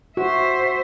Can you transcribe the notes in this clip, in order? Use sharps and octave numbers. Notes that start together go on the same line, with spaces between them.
F#4 C5 E5